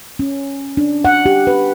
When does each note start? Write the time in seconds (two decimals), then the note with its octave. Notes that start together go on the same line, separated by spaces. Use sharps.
0.19 C#4
0.77 D4
1.05 F#5
1.26 G4
1.47 B4